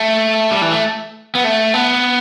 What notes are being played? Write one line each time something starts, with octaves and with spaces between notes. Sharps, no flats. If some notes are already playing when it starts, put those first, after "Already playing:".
Already playing: A3
G3
E3
A3
B3
A3
B3